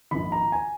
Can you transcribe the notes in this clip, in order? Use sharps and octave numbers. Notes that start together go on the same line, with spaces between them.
A#1 G#2 D#3 B5
A#5
G#5